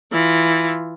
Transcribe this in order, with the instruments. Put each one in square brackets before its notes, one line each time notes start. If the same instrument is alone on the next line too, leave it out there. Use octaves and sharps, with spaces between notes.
[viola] E3 F4